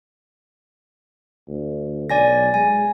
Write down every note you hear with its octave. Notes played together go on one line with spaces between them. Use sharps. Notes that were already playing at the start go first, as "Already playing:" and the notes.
D2
B1 D5 G#5 A#6
G#3 G#5